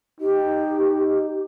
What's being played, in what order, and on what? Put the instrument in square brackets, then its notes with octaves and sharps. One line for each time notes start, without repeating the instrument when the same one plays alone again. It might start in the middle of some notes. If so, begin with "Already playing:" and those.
[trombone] D#4 [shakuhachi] G4